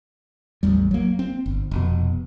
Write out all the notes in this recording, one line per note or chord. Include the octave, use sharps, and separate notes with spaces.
A1 E2 G3
F#3 A#3
C4
G1
F1 B2